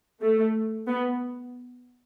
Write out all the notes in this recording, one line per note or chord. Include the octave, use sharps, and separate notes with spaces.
A3
B3